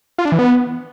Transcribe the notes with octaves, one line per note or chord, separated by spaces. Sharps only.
F4
D4
E3
B3